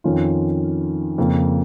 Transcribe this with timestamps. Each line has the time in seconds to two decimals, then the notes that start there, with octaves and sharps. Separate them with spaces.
0.04 F2 D#3 C#4 F4
1.18 F2 C#3 A#3 F4